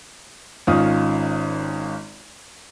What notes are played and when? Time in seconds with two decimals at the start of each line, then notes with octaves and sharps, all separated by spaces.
0.67 G#1 D#3 C#4 F4 D#6